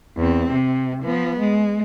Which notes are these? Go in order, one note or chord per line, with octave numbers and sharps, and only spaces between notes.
E2 C4
C3
F3 B3
G#3